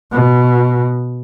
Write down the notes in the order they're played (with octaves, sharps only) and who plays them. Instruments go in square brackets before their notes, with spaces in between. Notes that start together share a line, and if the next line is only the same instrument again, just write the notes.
[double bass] B2